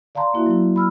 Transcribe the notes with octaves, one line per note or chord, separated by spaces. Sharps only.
D5 F5 A5 A#5 C6
A#3 E4 F#4 E5
F#3 E4
B5 E6 F6